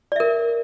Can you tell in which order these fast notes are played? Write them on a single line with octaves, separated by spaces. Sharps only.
D5 E5 A#4